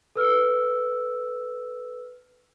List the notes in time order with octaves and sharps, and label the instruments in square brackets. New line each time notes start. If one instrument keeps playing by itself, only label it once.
[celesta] A4 B4 E6 F6